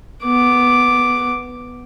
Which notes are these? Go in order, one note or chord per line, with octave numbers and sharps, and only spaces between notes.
B3 D6